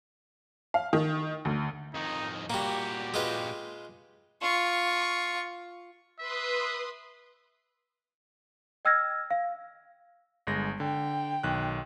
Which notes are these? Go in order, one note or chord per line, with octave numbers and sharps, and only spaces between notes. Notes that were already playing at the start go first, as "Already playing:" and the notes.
F5
D#3
D2
F2 D#3 D#4
A#2 G3 A#3 F#4 G4
G#3 F4 B4
F4 C#6
B4 E5 C6 D#6
D#5 G5 E6 F6 G#6 A#6
F5
G1 G#3 A#6
D3 G5
B1 D#3 F#6